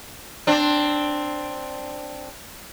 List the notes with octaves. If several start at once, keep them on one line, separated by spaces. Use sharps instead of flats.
C4 D4